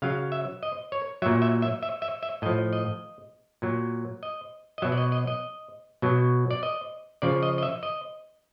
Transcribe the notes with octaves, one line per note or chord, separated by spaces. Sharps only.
C#3 F#3 F5
E5
D#5
C#5
A#2 F#3 E5
E5
E5
E5
E5
E5
A2 F3 D#5
D#5
A#2 F#3
D#5
D#5
B2 F#3 E5
D5
D#5
D#5
D#5
B2 F#3
D5
D#5
C#3 F3 D5
D#5
D#5
E5
D#5